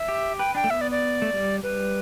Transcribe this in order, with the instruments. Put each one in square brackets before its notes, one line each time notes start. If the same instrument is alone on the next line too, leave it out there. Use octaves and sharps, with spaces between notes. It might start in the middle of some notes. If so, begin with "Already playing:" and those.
Already playing: [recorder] E5
[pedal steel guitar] G4
[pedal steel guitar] B4 [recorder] G5
[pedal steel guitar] D4 [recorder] G5
[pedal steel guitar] A3
[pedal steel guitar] B3 [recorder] E5
[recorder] D5
D5
[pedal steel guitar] A3
G3
[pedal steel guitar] G3 [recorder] B4